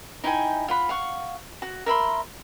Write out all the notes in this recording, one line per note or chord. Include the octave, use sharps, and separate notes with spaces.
D#4 E4 G5 G#5
F4 F#5 B5
F5 F#5 C#6
F#4
A#4 E5 B5 C6